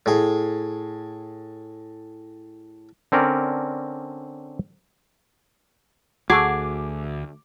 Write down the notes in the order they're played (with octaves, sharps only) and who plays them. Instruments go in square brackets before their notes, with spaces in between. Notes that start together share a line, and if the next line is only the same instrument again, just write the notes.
[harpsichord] A2 G#4
[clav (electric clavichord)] D3 C4 C#4 A#4 D5
[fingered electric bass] D2 [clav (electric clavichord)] F#4 A4 [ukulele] G#4 [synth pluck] D6